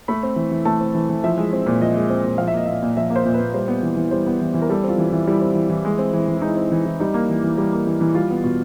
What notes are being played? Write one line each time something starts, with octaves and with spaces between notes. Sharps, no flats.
A3 B5
C4
E3
E3
A3 A5
C4
E3
E3
F3 E5
G#3
C4
A#2
F3 D#5
G#3
C4
A#2
F3 F5
E5
A#3 D#5
A#2 E5
A#2
F3 E5
A#3
C5
A#2
B4
A#2
G3 C5
B3
E3
E3
G3 C5
B3
E3
E3
A#4
G3 A4
C4
F4
E3
E4
E3
G3 E4
C4
E3
E3
G#3
C4
E3
E3
E4
G#3 D#4
C4
E3
E3
G3 D#4
A#3
E3
E3
G3
A#3
E3
E3
G3 F4
B3
B2